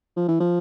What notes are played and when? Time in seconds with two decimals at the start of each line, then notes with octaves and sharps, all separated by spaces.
0.16 F3
0.28 E3
0.40 F3